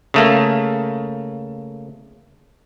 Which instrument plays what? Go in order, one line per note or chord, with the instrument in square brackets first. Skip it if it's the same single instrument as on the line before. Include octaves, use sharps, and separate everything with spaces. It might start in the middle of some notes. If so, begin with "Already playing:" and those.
[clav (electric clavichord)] C#3 A3 A#3